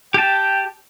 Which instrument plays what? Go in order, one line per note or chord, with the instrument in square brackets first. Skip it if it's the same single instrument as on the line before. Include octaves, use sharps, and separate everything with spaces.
[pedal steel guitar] G4 A5 [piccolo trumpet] G5